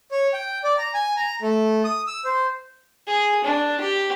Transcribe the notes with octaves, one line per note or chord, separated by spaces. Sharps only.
C#5
G5
D5
A#5
G#5
A#5
A3
D#6
E6
C5
G#4
D4
G4